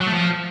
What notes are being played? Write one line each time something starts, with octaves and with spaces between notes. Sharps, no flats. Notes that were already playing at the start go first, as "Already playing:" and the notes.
F#3
A3
F3